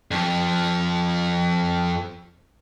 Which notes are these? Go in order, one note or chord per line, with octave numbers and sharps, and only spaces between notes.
F2 F3